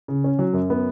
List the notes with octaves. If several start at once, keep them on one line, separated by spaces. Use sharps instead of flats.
C#3
C#4
F#3
F#2
B3